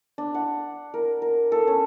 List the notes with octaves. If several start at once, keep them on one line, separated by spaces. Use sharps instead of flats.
D4
F#5
A#4
A#4
A4
C#4